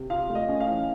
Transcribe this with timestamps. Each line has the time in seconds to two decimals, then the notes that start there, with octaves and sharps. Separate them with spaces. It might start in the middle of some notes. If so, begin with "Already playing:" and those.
Already playing: C3
0.10 F4 F5
0.30 A3
0.35 D#5
0.48 C#4
0.60 F5
0.67 E3